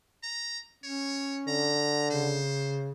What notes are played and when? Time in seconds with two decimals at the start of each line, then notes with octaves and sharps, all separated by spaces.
0.23 A#5
0.84 C#4 C#5
1.48 D3 A#5
2.10 C#3 C5